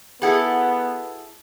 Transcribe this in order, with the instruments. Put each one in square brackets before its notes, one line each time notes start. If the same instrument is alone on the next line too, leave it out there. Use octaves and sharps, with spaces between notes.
[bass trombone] B3 [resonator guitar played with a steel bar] E4 G#4 A4 [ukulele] F#4 F#5